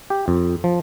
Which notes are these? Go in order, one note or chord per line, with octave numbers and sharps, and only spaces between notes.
G4
F2
F3